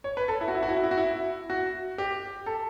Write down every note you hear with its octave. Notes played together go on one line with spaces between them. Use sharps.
C#5
B4
A4
E4
F#4
E4
F#4
E4
F#4
E4
F#4
E4
F#4
G4
A4